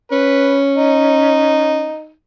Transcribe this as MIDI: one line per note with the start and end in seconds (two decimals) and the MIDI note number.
0.12 1.91 61
0.12 0.59 71
0.77 2.11 63